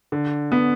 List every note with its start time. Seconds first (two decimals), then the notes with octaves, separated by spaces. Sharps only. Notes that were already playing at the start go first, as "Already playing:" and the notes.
0.12 D3
0.52 B3